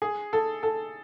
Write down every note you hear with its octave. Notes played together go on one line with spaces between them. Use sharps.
G#4
A4
A4